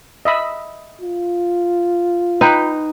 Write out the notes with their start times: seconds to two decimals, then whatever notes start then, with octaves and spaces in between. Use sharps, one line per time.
0.25 D#5 E5 B5
1.01 F4
2.41 D#4 B4 G5